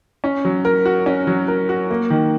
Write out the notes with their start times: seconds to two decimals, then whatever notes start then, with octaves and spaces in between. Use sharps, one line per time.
0.24 C#4
0.45 F#3
0.65 A#4
0.85 F#4
1.06 C#4
1.27 F#3
1.48 A#4
1.69 F#4
1.91 A#3
2.10 D#3